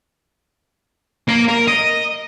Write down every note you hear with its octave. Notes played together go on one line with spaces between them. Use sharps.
A#3 A#4
A#4
D#5